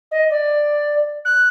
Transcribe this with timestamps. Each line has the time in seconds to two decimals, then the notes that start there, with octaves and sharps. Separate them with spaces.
0.11 D#5
0.30 D5
1.25 F#6